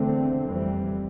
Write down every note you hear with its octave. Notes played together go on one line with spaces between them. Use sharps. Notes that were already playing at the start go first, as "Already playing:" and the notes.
Already playing: E2 D3 A3 C4
F2 E3 G3 C4